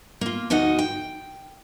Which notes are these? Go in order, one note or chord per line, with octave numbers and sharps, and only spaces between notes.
A#3 F4
D2 F3 D#4 F#4 D#5 F#5
G5